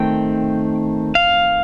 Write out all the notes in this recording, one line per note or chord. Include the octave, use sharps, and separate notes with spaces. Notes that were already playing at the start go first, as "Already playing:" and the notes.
Already playing: D#3 A3 C4 G5
F5